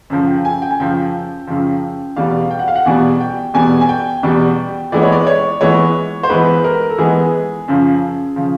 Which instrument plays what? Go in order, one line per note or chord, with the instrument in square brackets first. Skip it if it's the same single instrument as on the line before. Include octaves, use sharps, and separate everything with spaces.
[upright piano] F#2 C#3 F3
G5
G#5
G5
G#5
F#2 C#3 F3 G5
F#2 C#3 F3
E2 B2 G3 F5
G5
F#5
F5
F#5
E2 B2 G3 G#5
G5
E2 B2 G3 G#5
G#5
G5
E2 B2 G3
E3 G#3 B3 D5
C#5
D5
C#5
E3 G#3 B3 C#5
C5
E3 G#3 B3 B4
A#4
A4
E3 G#3 B3 G#4
F#2 C#3 F3
C#3 F3